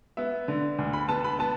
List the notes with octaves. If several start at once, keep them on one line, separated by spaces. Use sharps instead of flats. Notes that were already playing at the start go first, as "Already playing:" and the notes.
B3 E5
D3
D2
B5
B3 A5
B5
B3 A5